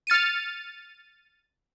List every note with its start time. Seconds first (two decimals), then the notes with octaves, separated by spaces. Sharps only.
0.07 F6 A6 C#7 D#7